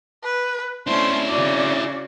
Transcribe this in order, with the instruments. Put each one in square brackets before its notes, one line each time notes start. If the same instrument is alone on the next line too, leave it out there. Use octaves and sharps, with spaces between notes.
[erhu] B4
[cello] A3 C#4 [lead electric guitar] D4 E4 [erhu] C5
[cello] C#3 F#4 [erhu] D5